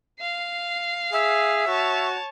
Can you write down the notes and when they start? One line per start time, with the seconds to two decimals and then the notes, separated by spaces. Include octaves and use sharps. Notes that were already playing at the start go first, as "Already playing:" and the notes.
0.20 F5 C7
1.13 G#4 E5
1.68 F#4 C#5 A5